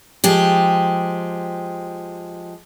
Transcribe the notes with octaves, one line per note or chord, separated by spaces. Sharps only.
F3 G#3 G4